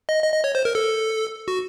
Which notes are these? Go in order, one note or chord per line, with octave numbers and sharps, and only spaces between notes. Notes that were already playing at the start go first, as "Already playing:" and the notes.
D#5
D#5
D#5
C#5
C5
A#4
A4
F#4